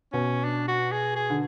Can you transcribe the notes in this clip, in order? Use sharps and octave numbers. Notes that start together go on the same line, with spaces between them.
B2 C#4
D4
F#4
G#4
G#4
D3